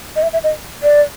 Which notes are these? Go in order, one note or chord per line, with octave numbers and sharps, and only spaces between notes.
D#5
E5
E5
D#5
D5